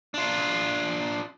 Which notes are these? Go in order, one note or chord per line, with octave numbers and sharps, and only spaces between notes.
D4 F4